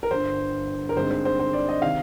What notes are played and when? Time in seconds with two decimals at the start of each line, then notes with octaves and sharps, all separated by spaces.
0.03 A#4
0.11 G1 G2 D3 C5
0.89 A#4
0.97 G2 D3 G#3 C4 D#4 C5
1.11 C5
1.25 C5
1.40 C5
1.53 D5
1.69 D#5
1.82 C3 D#3 F5